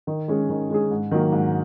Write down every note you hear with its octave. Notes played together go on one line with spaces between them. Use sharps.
D#3
G#3 C#4 G#4
D#3
G#3 C#4 G#4
G#2
D#3 F#3 A#3
G#2